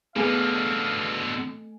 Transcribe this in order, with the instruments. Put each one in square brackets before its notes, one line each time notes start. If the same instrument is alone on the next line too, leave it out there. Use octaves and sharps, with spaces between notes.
[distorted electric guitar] B2 D3 [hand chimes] A3 G#5 [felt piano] B3 G#4 [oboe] F5